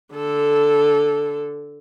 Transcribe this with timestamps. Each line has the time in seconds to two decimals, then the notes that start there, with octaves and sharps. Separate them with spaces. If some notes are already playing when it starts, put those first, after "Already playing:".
0.15 D3 A4